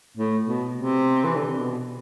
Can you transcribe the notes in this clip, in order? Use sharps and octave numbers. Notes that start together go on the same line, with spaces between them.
A2
B2
C3
E3
D3
C3
B2